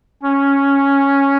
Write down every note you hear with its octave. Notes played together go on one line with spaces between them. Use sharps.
C#4